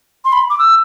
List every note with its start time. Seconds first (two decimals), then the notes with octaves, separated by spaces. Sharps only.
0.25 C6
0.32 B5
0.50 D6
0.59 E6